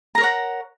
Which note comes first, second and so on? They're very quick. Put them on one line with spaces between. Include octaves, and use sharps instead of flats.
A#5 A#4 C#5 F#5